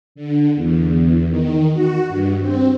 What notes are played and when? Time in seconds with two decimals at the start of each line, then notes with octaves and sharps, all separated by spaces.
0.15 D3
0.55 E2
1.29 D#3
1.73 F#4
2.08 G2
2.41 C4